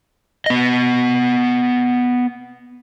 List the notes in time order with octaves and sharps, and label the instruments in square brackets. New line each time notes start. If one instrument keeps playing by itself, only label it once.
[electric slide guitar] B3 D#5